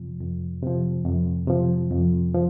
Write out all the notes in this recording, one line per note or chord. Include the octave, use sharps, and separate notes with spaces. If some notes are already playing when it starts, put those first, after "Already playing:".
Already playing: F2 C3 F3
F2
C3 F3
F2
C3 F3
F2
F3